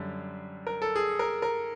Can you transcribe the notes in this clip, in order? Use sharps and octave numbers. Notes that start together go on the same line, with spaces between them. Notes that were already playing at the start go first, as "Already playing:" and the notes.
Already playing: F#2 D3 G3
A#4
A4
G#4
A#4
A#4